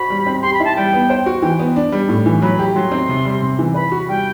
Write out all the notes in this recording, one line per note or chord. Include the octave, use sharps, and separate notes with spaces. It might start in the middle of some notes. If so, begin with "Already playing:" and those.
Already playing: F#4 C5 B5
G3
C4
G4 C6
B5
E4 A5
G3 G5
B3
C5
F#4
E3 G5
B3
D4
G3
A2
E3
F#3 B5
G4
F#3 C6
C4
C3
G3
C3
E3
B4 B5
F#4
G3 G5